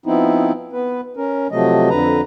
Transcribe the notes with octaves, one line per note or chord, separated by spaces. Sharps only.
F3 B3 C4 D#4 E4
B3 B4
C#4 A#4
C3 F3 F#3 A3 D#5
F2 D3 B4 A#5